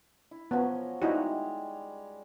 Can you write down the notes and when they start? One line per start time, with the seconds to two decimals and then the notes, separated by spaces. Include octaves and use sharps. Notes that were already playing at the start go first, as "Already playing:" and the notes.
0.31 E4
0.51 F3 F#3 B3 C#4
1.02 G3 G#3 D#4 E4 F#4